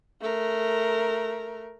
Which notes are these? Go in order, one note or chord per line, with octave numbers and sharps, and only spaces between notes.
A3 A#4